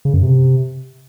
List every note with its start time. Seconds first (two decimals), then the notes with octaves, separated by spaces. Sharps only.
0.05 C#3
0.14 F#2
0.23 C3